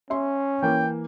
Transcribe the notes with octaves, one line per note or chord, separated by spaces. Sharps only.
C#4 E5 C6
E3 A#3 G5